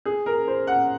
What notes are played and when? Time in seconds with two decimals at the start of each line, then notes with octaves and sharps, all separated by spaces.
0.05 G#4
0.26 A#4
0.47 C5
0.67 F#5